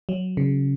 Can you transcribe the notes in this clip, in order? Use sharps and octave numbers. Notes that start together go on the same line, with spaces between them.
F#3
C#3